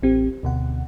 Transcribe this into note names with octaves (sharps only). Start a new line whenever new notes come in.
A1 C4 G4
D2 B2 F#5